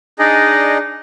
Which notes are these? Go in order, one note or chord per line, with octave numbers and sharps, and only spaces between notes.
D4 D#4 G#4 D5 D#5